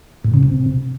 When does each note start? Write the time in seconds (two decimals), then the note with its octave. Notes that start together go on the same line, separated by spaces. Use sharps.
0.24 A2
0.34 C#3
0.43 C3